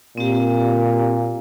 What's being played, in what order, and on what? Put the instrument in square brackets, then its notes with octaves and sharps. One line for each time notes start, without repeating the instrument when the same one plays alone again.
[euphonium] A#2 [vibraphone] C4 G4